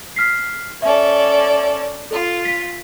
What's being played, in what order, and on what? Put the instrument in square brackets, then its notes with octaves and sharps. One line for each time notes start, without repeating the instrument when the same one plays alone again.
[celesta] F6 B6 C7
[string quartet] C#4 A4 D5 [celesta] E5
[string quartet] F4 [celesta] A4
[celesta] B6